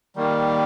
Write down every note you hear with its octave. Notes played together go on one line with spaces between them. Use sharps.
D#3 G3 A#3